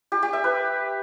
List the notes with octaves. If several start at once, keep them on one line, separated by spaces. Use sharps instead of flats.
G4
G4
E5
B4